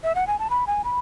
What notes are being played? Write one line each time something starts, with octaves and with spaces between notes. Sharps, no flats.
E5
F#5
G#5
A5
B5
G#5
B5